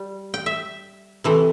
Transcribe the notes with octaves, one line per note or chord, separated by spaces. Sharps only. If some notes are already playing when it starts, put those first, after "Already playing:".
Already playing: G3
G5
E5
C3 E3 A3